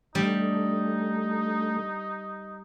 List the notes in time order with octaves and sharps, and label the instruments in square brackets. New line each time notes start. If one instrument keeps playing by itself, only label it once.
[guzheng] G3 [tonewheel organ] A3 [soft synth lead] D4 [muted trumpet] D#4